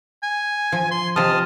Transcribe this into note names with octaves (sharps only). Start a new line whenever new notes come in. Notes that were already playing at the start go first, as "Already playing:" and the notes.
G#5
F3
C6
C3 F3 D#5 A5 D#6 F6